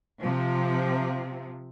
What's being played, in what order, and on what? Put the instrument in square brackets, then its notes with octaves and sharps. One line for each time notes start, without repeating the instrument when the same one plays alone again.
[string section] C3 F3